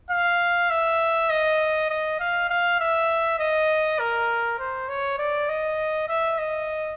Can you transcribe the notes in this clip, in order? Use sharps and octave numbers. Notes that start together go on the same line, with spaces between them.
F5
E5
D#5
D#5
F5
F5
E5
D#5
A#4
C5
C#5
D5
D#5
E5
D#5